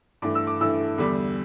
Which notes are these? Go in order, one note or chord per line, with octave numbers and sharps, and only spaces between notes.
G2 E3 A3 D6
E6
D6
G2 E3 A3 E6
E2 D3 G3